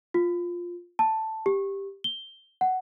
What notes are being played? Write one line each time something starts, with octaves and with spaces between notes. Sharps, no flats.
F4
A5
G4
G7
F#5